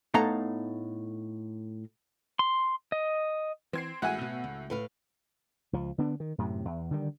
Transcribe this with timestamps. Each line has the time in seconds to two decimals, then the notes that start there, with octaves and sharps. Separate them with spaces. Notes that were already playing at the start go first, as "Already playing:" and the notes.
0.14 A2 B3 D#4 A4 F5 A#5
2.39 C6
2.92 D#5
3.73 E3 C4 G#6 C7
4.02 A1 A2 G#3 F#4 E5 F#5 G#5
4.21 B2 B3
4.44 C#2
4.70 A2 B4 F5
5.73 C#2 F3
5.98 D3 B3 D4
6.20 D#3
6.38 F#2 A2 C3
6.65 E2
6.91 D3 D#3 G3